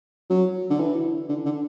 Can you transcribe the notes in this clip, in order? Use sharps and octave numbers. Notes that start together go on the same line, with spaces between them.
F#3
D3
E3
D3
D3